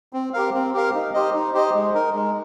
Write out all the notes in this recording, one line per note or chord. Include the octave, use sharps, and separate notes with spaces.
C4
G4 A#4 F5
C4
G4 A#4 F5
D#4
G4 C5 D#5
D#4
G4 C5 D#5
G#3
D#4 A#4
G#3